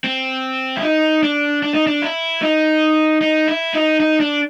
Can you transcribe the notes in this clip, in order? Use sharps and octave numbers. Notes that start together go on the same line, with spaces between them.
C4
E4
D#4
D4
D4
D#4
D4
E4
D#4
D#4
E4
D#4
D#4
D4